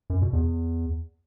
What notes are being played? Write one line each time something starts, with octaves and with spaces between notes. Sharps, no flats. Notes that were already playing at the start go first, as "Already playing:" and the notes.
F#2
B2
E2